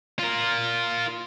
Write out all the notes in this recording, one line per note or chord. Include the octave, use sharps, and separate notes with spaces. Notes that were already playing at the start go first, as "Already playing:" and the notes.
F4 A#4